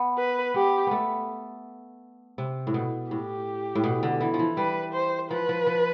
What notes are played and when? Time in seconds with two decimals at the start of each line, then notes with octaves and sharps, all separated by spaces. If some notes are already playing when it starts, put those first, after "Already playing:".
Already playing: B3
0.18 B4
0.54 B3 G4
0.87 A3 B3
2.38 C3
2.67 A2
2.74 B2
3.11 A2 G4
3.75 A2
3.84 B2
4.03 D3
4.20 E3
4.34 F3
4.39 E3
4.57 G3 B4
4.93 C5
5.31 F3 B4
5.49 F3
5.67 F3